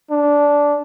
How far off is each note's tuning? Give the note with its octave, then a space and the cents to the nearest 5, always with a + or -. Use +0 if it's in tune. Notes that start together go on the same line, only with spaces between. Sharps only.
D4 -10